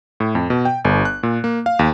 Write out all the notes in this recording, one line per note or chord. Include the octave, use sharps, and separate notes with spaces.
A2
F2
B2
G5
G1
F#6
A#2
A#3
F5
D#2